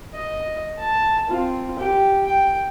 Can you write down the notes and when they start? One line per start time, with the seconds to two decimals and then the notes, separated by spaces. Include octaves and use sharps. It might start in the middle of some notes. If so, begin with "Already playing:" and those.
0.14 D#5
0.78 A5
1.29 C4 F4
1.78 G4 G5
2.25 G5